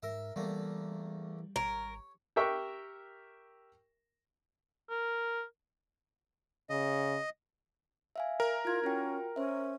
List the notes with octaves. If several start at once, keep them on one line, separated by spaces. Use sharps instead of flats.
G#2 A#4 E5
E2 E3 G3 A3 A#3
G#1 A#4 C#5
G4 A#4 E5 G5 C#6 F#6
A#4
C#3 D#5
E5 F5 G#5
A#4
E4 F4 G#6
C#4 F4 F#4 G5
C#4 C5 E5